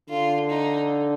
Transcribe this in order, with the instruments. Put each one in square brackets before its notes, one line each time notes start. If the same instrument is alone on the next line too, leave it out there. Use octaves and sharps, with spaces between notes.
[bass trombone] D3 [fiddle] F4
[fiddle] D#4